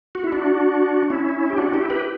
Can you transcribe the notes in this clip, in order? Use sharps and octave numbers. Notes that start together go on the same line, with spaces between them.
F#4
E4
D4 F#4
C#4 E4
G4
D4 F#4
E4 G4
G4 B4